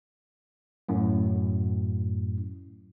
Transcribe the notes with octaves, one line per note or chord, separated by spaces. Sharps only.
F#2 A2